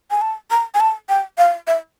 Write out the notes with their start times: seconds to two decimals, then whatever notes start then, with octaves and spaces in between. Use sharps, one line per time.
0.11 G#5
0.21 A5
0.51 A#5
0.74 G#5
0.80 A5
1.09 G5
1.38 F5
1.67 E5